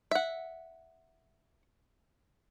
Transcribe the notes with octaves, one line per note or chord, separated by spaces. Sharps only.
E5 F#5